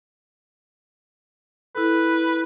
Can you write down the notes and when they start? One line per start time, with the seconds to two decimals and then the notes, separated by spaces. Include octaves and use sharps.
1.75 E4 A4 B4